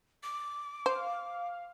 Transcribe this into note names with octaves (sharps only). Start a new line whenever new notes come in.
D6
C5 F5